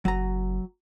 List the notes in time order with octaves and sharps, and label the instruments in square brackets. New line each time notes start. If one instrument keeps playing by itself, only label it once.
[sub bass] F#1 [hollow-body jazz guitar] F#3 A#5